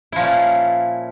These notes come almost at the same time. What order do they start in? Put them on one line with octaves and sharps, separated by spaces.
E4 F3 A#2 C#4